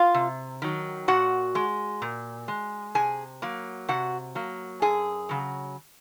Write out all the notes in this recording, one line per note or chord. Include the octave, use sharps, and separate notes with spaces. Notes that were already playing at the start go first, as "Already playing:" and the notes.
Already playing: F4 F5
C3
D#3 F#3
A#2 F#4 F#5
G#3
A#2
G#3
C3 G#4 G#5
F#3 A#3
C3 F#4 F#5
F#3 A#3
F#2 G#4 G#5
C#3 F#3